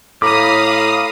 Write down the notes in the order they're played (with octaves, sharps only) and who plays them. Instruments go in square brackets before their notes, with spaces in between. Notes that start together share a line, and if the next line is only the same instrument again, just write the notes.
[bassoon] A2 [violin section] F5 D#6 [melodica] A#5 B5 [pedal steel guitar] D6